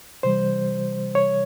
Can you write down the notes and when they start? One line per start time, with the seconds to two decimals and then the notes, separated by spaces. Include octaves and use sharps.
0.23 C3 E3 G3 C5
1.15 C#5